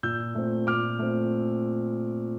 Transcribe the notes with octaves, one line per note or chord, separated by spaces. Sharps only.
A#2 E6 G6
A3 C4
A#2 D6 F6
A3 C4